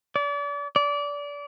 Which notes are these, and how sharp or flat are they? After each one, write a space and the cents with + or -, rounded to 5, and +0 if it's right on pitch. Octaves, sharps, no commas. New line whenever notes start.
D5 -35
D5 -25